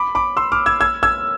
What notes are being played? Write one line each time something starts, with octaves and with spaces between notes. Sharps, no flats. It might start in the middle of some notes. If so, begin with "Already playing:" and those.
Already playing: B5 D6
B5 D6
C6 E6
D6 F6
E6 G#6
E6 G#6
E6 G#6